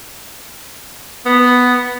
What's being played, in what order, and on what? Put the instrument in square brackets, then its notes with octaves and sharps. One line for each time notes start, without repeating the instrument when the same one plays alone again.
[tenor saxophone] B3